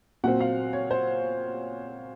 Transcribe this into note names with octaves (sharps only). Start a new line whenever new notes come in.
A#2 F#3 C4 F#5
F5
C#5
C5